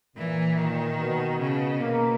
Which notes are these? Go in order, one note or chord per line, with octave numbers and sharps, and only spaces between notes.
A#2 E3
D#3
B2
C#3
B2 A#3